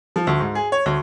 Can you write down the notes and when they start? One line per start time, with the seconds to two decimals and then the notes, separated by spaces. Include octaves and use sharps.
0.16 F3
0.27 D2
0.40 G#2
0.55 G#4
0.72 C#5
0.86 D2